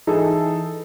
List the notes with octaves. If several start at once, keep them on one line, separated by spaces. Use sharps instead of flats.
E3 D#4 E4 G#4 A4